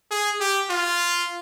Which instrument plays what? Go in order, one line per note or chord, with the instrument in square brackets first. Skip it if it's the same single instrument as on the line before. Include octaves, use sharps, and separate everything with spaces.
[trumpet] G#4
G4
F4